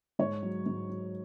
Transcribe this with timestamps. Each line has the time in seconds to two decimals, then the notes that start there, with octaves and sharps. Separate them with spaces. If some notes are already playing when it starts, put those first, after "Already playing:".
0.19 G#2 C#5
0.43 F#3
0.66 G#2
0.90 F#3